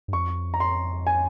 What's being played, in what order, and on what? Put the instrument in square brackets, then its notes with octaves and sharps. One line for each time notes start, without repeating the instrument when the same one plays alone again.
[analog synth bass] G2
[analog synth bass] F2 [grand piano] C#6
[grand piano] A#5
C6
G#5